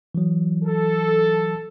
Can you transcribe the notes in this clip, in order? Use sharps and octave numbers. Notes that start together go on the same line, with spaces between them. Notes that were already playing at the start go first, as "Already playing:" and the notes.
E3 F#3
A4